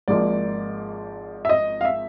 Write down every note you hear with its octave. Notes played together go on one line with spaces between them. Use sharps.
G#1 G#2 F3 A#3 D5
E5
D#5
F5
E5